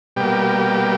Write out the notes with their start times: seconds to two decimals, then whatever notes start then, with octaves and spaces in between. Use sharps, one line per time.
0.16 B2 G3 A#3 G4